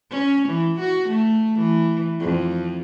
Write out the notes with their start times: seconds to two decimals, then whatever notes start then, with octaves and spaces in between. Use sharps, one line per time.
0.11 C#4
0.48 E3
0.79 F#4
1.09 A3
1.59 E3
2.20 F2